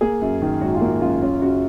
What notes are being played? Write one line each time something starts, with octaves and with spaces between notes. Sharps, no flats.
A#3 G#4
F#2
D#3
G#1 F#4
F4
A#3
F#2 F4
C#4 F4
C#3 F#4